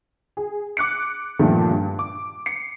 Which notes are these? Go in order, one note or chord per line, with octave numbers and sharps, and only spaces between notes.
G#4
D6 F#6 C#7
G2 A#2 D#3 F3 A3
G2
D6
C7 C#7